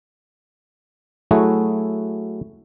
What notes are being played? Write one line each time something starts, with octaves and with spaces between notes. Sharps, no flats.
F#3 A3 E4 F#4 G#4